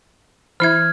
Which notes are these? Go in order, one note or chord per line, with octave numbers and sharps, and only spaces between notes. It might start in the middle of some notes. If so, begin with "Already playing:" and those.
E3 E4 E5 F6 G#6